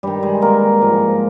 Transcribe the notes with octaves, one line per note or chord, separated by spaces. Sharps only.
G2 D#3 G3 G4
G#3 G#4
A#3 A#4
G#2 F3